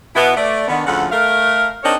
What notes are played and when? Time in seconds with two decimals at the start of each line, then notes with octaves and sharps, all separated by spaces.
0.16 B2 B3 E4
0.37 A3 D5
0.68 D3 D#3 B3
0.87 D2 C#3 F3 A4 F#5
1.12 A3 A#4 F5
1.83 C4 D4 D#4 G#4 A#4 C#5